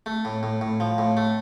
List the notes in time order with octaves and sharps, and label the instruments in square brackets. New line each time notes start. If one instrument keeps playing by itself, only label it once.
[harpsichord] A3
A2
A2
A2
F3
A2
A3